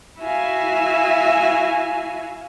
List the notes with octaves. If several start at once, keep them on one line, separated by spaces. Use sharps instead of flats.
E4 F#4 E5 F5 G#5